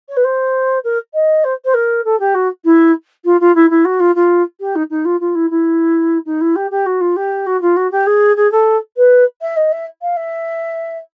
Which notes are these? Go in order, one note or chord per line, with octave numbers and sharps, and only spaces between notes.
C#5
B4
C5
A#4
D#5
C5
C5
A#4
A4
G4
F#4
E4
F4
F4
E4
E4
F#4
F4
F4
G4
D#4
D#4
F4
F4
E4
E4
D#4
E4
G4
G4
F#4
F4
G4
F#4
F4
F#4
G4
G#4
G#4
A4
B4
E5
D#5
E5
F5
E5